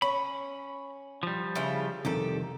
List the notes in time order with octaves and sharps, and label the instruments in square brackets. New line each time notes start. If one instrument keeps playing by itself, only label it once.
[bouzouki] C#4 [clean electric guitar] B5
[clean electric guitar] F3 G3
[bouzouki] C#3 E4 F4
[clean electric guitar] C2 F2 D#3 [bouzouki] G4 A4